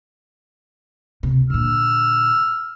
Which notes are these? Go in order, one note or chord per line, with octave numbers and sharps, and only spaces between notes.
C#2 C3
A#2 D3 E6 F6